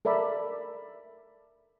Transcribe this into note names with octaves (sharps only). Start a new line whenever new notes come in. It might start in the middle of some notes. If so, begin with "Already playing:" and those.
A4 A#4 D5 E5 B5